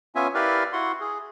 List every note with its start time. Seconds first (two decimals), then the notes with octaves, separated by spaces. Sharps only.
0.16 B3 C#4 F4 E5 G#5
0.34 E4 G4 A#4 B4 D5 F5
0.73 E4 F#4 F#5 C6
1.00 G#4